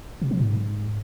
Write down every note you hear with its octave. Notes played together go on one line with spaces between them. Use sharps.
C3
F3
G#2